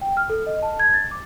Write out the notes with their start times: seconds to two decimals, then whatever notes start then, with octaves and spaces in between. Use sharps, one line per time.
0.01 G5
0.17 F6
0.30 A4
0.47 D#5
0.62 A5
0.80 G#6
0.94 A6
1.11 D6